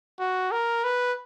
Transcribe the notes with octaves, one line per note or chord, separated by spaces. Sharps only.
F#4
A#4
B4